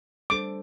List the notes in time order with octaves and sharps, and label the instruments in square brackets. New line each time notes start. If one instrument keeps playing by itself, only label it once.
[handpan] G3 D4 A4 C5 [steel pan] D6